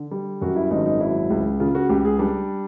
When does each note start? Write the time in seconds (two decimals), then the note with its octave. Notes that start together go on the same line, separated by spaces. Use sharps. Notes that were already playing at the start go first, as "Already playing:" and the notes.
Already playing: D3
0.11 G3
0.41 F#2 F#4
0.56 E4
0.71 G#1 D#4
0.86 D#4
1.01 F#3 E4
1.30 C#2
1.60 C#3 F4
1.75 F#4
1.89 C#2 G4
2.05 G#4
2.19 G3 D4